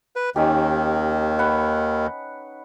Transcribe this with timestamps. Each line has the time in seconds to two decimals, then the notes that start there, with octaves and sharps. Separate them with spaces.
0.16 B4
0.36 D#2 D#3 C#4 D#4 G4
1.39 B4 F#5